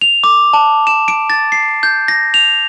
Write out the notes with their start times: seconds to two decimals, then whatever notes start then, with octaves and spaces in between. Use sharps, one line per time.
0.01 F7
0.24 D6
0.53 A5
0.87 E7
1.08 D7
1.30 A6
1.52 C7
1.83 G6
2.08 A#6
2.34 F7